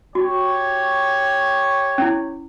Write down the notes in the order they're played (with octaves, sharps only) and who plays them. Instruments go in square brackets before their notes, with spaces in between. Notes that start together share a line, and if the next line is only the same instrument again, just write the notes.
[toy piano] F#4 [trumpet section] G4 C#5
[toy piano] C#4 E4